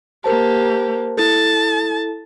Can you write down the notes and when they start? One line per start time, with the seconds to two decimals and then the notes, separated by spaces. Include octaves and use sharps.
0.24 A#3 G4 A#4 C5 A5
1.17 E4 A4 A5